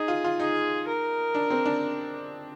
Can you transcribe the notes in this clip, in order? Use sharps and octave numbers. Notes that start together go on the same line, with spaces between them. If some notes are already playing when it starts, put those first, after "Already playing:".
Already playing: D#4 G#4
F4
F4
D#4 G#4
A#4
D4
C4
D4